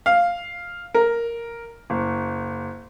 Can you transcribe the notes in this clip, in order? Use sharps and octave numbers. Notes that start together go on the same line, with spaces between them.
F5
A#4
F#1